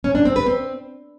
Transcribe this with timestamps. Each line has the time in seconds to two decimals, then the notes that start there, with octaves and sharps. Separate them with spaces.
0.04 C#4
0.15 D4
0.25 C4
0.36 B4
0.46 C4